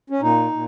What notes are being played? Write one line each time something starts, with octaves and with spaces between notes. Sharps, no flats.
C#4
A#2 D#4
A#2